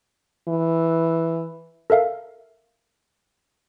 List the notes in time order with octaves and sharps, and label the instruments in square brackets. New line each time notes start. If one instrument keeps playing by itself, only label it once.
[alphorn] E3
[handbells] A4 A#4 E5 F5